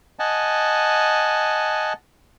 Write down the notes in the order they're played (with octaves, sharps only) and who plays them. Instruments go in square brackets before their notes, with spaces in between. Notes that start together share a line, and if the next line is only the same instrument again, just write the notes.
[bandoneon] D#5 F#5 G#5 A5